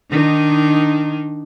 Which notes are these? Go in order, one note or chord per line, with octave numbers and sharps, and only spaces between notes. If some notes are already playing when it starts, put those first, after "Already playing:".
D#3 D4 D#4